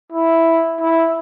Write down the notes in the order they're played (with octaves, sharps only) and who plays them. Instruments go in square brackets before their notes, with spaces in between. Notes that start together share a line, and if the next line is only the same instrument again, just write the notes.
[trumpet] E4
E4